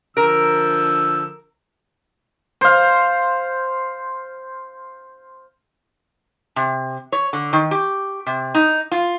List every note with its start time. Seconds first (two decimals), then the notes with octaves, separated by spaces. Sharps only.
0.17 D3 F3 A#4 E6
2.61 C5 F5
6.56 C3
7.12 C#5
7.33 D3
7.53 D#3
7.71 G4
8.26 C3
8.55 D#4
8.91 F4